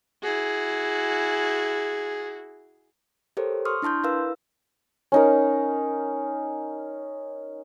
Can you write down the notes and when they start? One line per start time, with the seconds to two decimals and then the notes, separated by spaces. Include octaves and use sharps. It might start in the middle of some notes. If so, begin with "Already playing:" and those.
0.23 E4 F#4 G#4
3.37 G4 A4 A#4 C5 C#5
3.65 C6 C#6 D#6 F6
3.82 D4 E4 A5 C6 G6
4.03 E4 A#4 B4 F5 E6
5.12 C#4 D#4 A#4